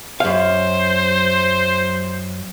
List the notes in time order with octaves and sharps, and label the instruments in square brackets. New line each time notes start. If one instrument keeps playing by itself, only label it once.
[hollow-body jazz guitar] F#2 F5 [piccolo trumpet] C5